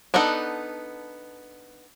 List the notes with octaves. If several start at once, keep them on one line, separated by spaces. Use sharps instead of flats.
B3 D4 D#4 A4 F#5